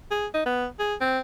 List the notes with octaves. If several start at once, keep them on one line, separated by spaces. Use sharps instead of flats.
G#4
D#4
B3
G#4
C4